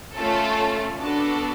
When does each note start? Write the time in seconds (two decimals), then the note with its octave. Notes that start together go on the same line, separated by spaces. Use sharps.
0.13 A3 C#4 F4 A4
0.97 B3 D4 F#4 A4